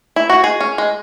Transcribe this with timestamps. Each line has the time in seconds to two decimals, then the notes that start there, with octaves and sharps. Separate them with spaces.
0.16 E4
0.30 F#4
0.43 G#3 G#4
0.60 C#4
0.78 G#3